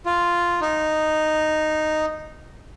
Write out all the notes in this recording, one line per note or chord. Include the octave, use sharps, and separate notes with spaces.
F4
D#4